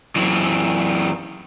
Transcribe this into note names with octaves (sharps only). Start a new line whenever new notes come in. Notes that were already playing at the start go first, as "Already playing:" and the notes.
F#2 E3